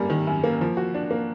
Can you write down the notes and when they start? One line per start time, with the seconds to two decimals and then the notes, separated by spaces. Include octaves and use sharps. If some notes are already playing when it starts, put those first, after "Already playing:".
Already playing: F#2 G3 A#3
0.10 D#3
0.27 F#2
0.44 A#3
0.61 F3
0.77 F#4
0.94 D4
1.11 A#3